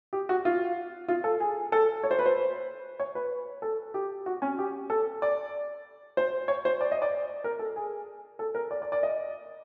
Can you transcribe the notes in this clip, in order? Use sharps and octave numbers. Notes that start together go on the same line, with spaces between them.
G4
F#4
F4
F4
A4
G#4
A4
C#5
C5
B4
C5
C#5
B4
A4
G4
F#4
C#4
G4
A4
D5
C5
C#5
C5
D5
D#5
D5
A#4
A4
G#4
A4
A#4
D5
D5
D5
D#5